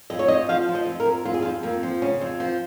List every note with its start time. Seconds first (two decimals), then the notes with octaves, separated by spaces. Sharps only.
0.10 F2 D#5
0.19 C#5
0.28 F2 D#5
0.49 F3 F5
0.68 F3
0.75 D#5
0.86 F2
1.00 A#4
1.06 F2
1.25 F2 F4
1.34 G#4
1.42 F2 F4
1.63 F2 A#3
1.83 F3
2.02 C#3 C#4
2.21 F2
2.40 F3